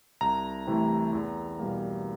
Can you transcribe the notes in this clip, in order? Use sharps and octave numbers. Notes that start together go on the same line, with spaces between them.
C2 A#5
C3 E3 A3
E2
B2 G3 A#3